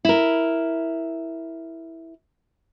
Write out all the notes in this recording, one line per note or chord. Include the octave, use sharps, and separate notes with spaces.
E4 A#4